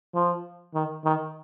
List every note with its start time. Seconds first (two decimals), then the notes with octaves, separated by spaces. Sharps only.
0.14 F3
0.74 D#3
1.05 D#3